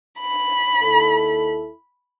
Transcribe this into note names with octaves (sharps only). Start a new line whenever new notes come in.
B5
D#2 E4 A4